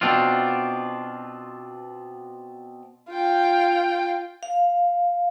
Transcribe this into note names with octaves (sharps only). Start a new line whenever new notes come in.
B2 C4 D4 F4
F4 G5
F5